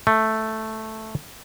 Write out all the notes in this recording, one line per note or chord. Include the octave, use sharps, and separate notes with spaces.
A3